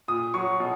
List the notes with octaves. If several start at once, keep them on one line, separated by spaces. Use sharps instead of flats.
A#2 D#6
F#3 C#6
B2